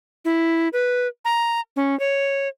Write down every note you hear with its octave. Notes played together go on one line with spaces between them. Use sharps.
E4
B4
A#5
C#4
C#5